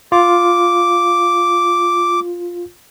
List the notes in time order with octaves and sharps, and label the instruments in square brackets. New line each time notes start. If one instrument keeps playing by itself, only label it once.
[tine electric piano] F4 [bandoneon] D6